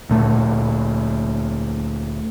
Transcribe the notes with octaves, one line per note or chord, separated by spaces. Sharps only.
D2 A#2 A3